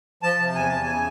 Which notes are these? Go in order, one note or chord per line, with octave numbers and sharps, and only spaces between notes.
F3 A5
C3
E2 G#5
E2 A5
G#5
C#3